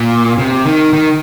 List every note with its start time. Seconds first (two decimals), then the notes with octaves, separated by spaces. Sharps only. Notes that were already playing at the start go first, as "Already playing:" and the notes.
Already playing: A#2
0.38 C3
0.65 D#3
0.93 D#3